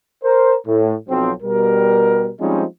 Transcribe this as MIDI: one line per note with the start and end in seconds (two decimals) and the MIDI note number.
0.23 0.55 70
0.23 0.55 72
0.67 0.93 45
1.09 1.31 35
1.09 1.31 53
1.09 1.31 54
1.09 1.31 60
1.43 2.30 47
1.43 2.30 55
1.43 2.30 70
2.40 2.63 53
2.40 2.63 55
2.40 2.63 56
2.40 2.63 60
2.40 2.63 61
2.40 2.63 63